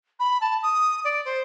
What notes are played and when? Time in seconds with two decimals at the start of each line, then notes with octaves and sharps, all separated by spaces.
0.20 B5
0.41 A5
0.63 D#6
1.05 D5
1.25 C5